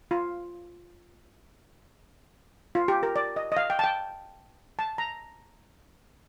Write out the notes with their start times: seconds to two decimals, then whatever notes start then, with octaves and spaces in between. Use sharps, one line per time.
0.11 F4
2.75 F4
2.88 G4
3.03 A#4
3.16 D5
3.36 D#5
3.52 D#5
3.57 F5
3.70 G5
3.79 A5
3.84 G5
4.79 A5
4.98 A#5